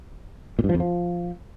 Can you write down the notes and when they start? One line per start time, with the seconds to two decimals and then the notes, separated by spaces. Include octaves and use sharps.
0.59 A#2
0.64 G2
0.69 F3
0.75 F2
0.80 F3